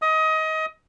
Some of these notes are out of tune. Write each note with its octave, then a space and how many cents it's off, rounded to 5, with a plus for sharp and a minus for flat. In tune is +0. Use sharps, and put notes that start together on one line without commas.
D#5 +25 D#6 +25